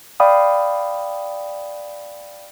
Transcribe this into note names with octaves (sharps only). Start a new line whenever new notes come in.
D5 F5 G5 B5 D#6